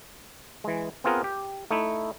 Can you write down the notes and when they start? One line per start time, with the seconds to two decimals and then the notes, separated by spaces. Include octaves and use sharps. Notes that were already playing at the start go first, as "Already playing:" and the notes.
0.64 E3 G#3
1.04 B3 C4 F4 G#4 A#4 F#5
1.24 G4
1.71 A3 D#4 E4